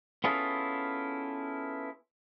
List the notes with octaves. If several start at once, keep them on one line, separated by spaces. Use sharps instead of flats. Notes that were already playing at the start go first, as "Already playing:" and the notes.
B3 C#4 E4 F4 G#4 A4